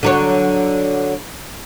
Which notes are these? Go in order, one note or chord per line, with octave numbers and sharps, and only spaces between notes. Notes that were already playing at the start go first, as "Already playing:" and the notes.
D3 F#3 C#5